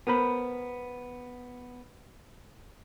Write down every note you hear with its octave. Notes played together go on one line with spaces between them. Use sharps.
B3 A#4 C5 B5